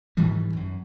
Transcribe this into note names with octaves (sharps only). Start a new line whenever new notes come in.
G#2 D#3 E3 G3
B1 F#2